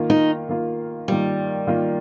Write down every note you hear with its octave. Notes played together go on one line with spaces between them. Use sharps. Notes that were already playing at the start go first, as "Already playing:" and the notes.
Already playing: D#3 A#3 F4
D#4
D#3 A#3 F4
D#3 G3 A#3 F4
D#3 A#3 F4